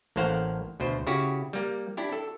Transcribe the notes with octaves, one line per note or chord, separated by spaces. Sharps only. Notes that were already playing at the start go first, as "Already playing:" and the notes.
A1 A2 A#3 C5 F5 F#5
D2 B2 C5
C#3 E4 F#4 G4
G3 A#3
D4 E4 G4
A4